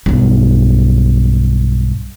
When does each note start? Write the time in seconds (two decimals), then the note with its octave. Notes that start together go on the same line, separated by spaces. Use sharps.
0.06 B1 G2